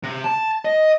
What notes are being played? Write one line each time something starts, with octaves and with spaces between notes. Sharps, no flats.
C3
A5
D#5